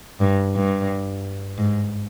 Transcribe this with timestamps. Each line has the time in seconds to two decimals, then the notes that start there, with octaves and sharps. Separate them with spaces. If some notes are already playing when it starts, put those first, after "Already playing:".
0.20 G2
0.55 G2
1.58 G#2